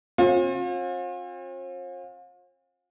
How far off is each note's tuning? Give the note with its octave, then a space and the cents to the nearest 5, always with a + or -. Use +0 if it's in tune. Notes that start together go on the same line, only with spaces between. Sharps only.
C4 +45 F4 +40